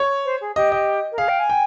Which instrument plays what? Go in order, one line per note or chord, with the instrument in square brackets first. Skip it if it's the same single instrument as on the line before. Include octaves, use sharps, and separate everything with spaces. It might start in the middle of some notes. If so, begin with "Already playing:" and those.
Already playing: [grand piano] C#5
[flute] C5
G#4
[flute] G4 [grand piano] D#5
[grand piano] D#5
[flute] A#4
[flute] G#4 [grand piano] F5
[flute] G5
G#5
[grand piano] G5